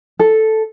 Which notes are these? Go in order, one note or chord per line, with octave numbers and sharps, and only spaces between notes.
A4